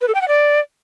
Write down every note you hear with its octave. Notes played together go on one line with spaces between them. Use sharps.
B4
A4
G5
F#5
D5